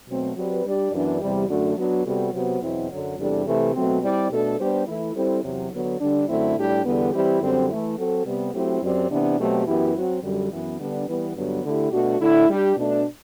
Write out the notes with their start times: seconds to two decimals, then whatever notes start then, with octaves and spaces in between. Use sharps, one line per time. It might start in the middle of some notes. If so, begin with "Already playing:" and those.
0.09 B2 F#3 A3 C4
0.36 F#3 C4 G4 B4 D5
0.65 G3 D4 G4 D5
0.92 F#2 E3 B3 D4
1.21 E2 C3 G3
1.49 F#2 D3 A3 D4 F#4
1.77 F#3 B3 D4 F#4
2.06 C3 G3 B3 F#4 A4
2.34 C3 F#3 B3 F#4 C5
2.61 E2 B2 F#3 C4 E4
2.91 F#2 D3 F#3
3.18 E2 C3 G3 D4 A4
3.47 C3 E3 A3
3.75 B2 F#3 A3 C4
4.03 G3 C4 E4 G4 D5
4.31 B2 A3 D4 A4
4.60 G3 B3 D4 G4 C5
4.87 E3 A3 E4
5.16 G3 C4 E4 A4 C5
5.44 E2 C3 F#3
5.72 D3 F#3 B3
6.01 D3 G3 D4
6.28 F#2 D3 A3 C4 E4
6.57 A2 G3 D4 G4
6.85 E2 D3 G3 B3
7.14 E3 G3 C4 E4 G4
7.42 F#2 D3 G3 C4
7.69 E3 A3 E4
7.98 F#3 C4 F#4 A4
8.26 C3 G3 B3
8.54 F#3 A3 C4 E4 G4
8.83 F#2 F#3 C4 G4 D5
9.10 C3 E3 B3 D4
9.39 B2 F#3 A3 C4 G4
9.67 F#2 E3 B3 E4 G4
9.95 F#3 C4 F#4
10.24 F#2 D3 G3
10.52 F#2 E3 B3
10.80 D3 G3 B3 D4
11.08 E3 G3 B3
11.36 G2 D3 F#3 B3
11.64 D3 A3 E4 G4
11.92 B2 A3 D4 F#4
12.20 D3 A3 E4
12.49 G3 D4 G4
12.77 B2 A3 D4